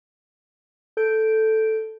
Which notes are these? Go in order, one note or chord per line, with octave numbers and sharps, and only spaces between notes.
A4 G6 D7